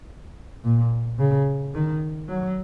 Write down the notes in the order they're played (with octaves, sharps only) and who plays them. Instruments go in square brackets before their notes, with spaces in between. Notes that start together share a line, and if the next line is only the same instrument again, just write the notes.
[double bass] A#2
C#3
D#3
F#3